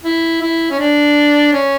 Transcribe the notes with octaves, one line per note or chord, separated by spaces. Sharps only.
E4
E4
C#4
D4
C#4